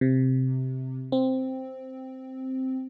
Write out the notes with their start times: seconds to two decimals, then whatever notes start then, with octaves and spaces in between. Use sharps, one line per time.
0.01 C3
1.12 C4